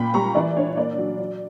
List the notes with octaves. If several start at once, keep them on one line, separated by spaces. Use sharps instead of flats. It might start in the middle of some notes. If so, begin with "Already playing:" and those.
Already playing: A#2 A#3 G5 B5
G3 A#5 C#6
E3 D5
D4 C#5
A#3 D5
F#3
F#3